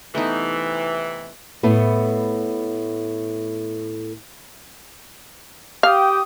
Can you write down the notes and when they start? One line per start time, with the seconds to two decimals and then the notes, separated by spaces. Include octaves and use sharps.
0.15 C3 E3 A3 B3 D#4
1.63 A2 A3 B3
5.83 G4 F5 G5 D#6